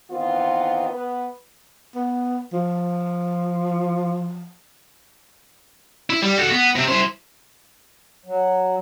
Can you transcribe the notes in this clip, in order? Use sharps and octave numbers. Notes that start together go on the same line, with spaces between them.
D#3 E3 B3 C4 F4
B3 B4
B3
F3
E4
G3
F#4 A4
B3
C3 C4
E4 C5
F#3